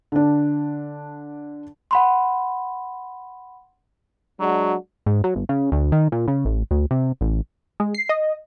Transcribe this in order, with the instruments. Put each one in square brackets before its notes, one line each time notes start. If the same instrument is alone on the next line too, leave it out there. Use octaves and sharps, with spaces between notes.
[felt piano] D3 D4
[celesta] F#5 B5 C6
[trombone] F#3 [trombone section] G#3 D4 F#4
[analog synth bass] G#2
F#3
G1
C#3
D2
D#3
A#2
C#3
A1
D2
C3
A1
[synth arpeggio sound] G#3
C7
D#5